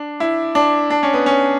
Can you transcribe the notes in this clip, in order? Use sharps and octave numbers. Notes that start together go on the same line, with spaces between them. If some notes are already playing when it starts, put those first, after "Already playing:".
Already playing: D4
E4
D4
D4
C#4
B3
C#4